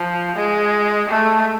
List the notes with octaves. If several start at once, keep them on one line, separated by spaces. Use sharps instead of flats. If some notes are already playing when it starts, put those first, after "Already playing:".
Already playing: F3
G#3
A3